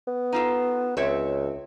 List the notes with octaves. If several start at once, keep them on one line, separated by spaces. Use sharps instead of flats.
B3
D#4 F4 A4
C#2 C4 C#5 E5